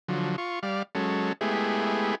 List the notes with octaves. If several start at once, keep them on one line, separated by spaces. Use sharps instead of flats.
D3 F3 F#3
F4 C#6
G3 D5 F5
F#3 G#3 C#4 A4
G#3 A3 B3 E4 G4 G#4